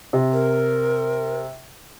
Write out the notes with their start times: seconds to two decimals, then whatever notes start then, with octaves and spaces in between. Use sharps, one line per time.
0.13 C3
0.33 A#4